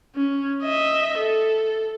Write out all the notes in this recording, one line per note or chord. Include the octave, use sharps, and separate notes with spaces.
C#4
D#5 E5
A4